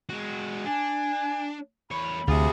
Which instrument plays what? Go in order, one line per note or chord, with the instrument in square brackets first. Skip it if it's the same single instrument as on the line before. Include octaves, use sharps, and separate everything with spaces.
[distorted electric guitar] G#3 F#4
[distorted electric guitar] D4 [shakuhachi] G#5
[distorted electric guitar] E2 C#5 [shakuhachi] B5
[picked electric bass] D2 [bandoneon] C3 G#4 [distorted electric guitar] F4 F#4